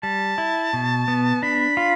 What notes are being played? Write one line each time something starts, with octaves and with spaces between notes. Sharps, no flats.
G3 A5
E4
B2
B3
D4 B5
F4